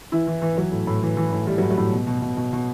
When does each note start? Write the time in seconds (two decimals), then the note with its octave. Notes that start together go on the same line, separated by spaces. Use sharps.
0.12 E3 E4
0.27 E3
0.42 E3
0.57 E3 F#3
0.72 A2
0.87 A2
1.02 E3
1.17 E3
1.32 A2
1.47 E3 G3
1.58 F#3
1.62 A2
1.70 F#3
1.78 A2
1.92 B2
2.07 B2
2.22 B2
2.37 B2
2.53 B2